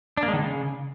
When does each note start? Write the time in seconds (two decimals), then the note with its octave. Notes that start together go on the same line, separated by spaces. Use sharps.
0.17 D4
0.23 A#3
0.28 G#3
0.33 D#3
0.39 C#3